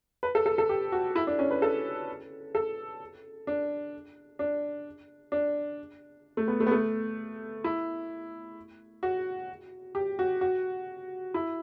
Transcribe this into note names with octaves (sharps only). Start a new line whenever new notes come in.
B4
A4
A4
A4
G4
F#4
E4
D4
C#4
B4
A4
A4
D4
D4
D4
A3
B3
A3
B3
A3
E4
F#4
G4
F#4
F#4
E4